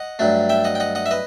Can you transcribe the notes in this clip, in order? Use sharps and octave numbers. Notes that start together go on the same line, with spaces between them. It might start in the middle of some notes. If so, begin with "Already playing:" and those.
Already playing: D#5 F#5
G2 F#3 A3
E5 G5
D#5 F#5
G5
D#5 F#5
D#5 F#5
E5
B4 D#5